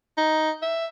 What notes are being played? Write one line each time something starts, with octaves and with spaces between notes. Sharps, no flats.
D#4
E5